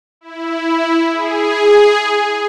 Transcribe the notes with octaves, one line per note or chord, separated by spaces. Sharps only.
E4
G#4